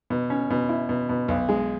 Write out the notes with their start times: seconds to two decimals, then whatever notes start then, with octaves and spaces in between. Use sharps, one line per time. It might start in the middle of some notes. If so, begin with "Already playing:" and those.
0.10 B2
0.30 C#4
0.50 B2
0.69 E4
0.89 B2
1.09 B2
1.28 B1
1.49 G#3